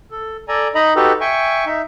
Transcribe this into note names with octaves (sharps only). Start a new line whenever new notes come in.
A4
A4 D5 G#5 A#5
D#4 D#5 A#5 B5
D#4 F#4 G4 A4 B4
E5 G5 G#5 C#6
D#4 E5